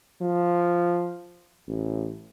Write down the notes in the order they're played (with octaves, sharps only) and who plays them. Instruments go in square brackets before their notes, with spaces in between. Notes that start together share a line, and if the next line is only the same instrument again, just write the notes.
[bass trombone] F3
A1